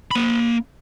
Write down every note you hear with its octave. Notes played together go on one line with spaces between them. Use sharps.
A#3 B5